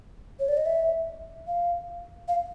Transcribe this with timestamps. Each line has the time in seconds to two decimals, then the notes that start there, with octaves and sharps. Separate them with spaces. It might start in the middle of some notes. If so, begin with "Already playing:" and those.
0.40 C#5
0.49 D5
0.57 D#5
0.66 E5
1.47 F5
2.28 F5